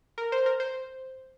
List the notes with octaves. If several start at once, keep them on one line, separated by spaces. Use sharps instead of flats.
A#4
C5
A#4
C5